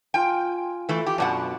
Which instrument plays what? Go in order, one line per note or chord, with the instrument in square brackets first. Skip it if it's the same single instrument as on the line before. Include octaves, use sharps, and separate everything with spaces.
[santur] F4 G#5 [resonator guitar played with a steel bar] G5
[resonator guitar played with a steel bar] E3 A3
G4
[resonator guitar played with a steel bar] F#2 B2 F#5 [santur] D4